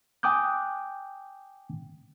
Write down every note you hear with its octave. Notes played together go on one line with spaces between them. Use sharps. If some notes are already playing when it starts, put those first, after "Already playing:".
G5 G#5 D6 D#6 F#6 G6